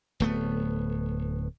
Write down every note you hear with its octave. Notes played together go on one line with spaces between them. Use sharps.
D1 A3 B3